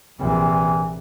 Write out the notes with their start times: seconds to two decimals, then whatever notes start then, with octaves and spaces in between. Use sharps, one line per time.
0.19 A#1 C3 E3